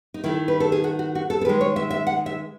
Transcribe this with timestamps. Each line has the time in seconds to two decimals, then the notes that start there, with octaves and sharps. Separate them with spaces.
0.14 D#4
0.24 D#3 A3 E4
0.48 B4
0.60 A4
0.72 G#4
0.84 F#4
0.99 F#4
1.15 F#4
1.30 A4
1.41 A4
1.45 D#3 G#3 B4
1.61 C#5
1.76 E5
1.90 E5
2.07 F#5
2.26 E5